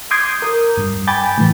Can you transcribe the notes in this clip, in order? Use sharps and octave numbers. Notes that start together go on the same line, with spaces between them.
C6 D6 D#6 G6 G#6 C7
A#4 D#6 G6
G2
G5 G#5 B5 D6 G6 A6
A2 E3